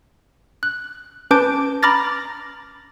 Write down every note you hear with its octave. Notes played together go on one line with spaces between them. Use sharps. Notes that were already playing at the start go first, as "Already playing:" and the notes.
F#6
C#4 B4 A5 D6 G6 D7
A#5 B5 D6 F6 A6 A#6